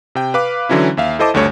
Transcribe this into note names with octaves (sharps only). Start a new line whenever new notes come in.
C3 G5
B4 F5 D6
D3 E3 F#3 C#4 E4
D#2 E5 F5
E4 A4 C5 D#5 A5 D6
G#1 D2 G2 A3 C#5